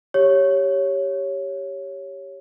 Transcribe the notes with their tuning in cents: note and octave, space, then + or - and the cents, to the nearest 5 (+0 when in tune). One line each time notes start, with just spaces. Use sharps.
G4 +0 C#5 +0